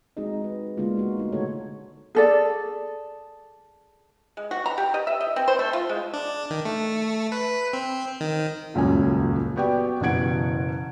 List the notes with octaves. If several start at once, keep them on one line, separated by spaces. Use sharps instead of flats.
G#3 C4 D#4 F#4 G#4 D#5
D#4 B4
D3 G#3 A#3 B3 D4 F4
D#4 F#4
A3 D#4 F4
D3 F#4 A4 C#5
G#4 A4 D5
G#3
F#4
A#5
G4
D#5
E5
D#5
C4
C5
A3
F4
G#3
D4
D#3
A3
B4
C4
D#3
D#1 C#2 F#2 C#4 G#5
B3 F#4 G4 D5 G5
F#1 B2 E3 F#5 G#6 D7